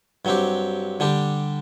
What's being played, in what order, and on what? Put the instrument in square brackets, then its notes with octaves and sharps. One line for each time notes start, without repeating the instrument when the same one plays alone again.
[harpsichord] G2 F#3 C4 G4
D3 G3 D4 G4